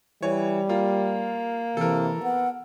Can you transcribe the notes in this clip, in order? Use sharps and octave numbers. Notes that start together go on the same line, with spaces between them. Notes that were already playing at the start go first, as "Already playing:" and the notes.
E3 G3 C#5
A#3 F4
C3 E3 A4 A#4
B3 F#5